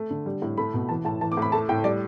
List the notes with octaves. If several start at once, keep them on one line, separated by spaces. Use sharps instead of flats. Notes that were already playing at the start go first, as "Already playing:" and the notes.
Already playing: A3
D3
G3
A2
A3 B5
B2
E3 A5
A2 A5
E3 A5
D6
A2
B5
A3 A5
A2 G5
G3 D5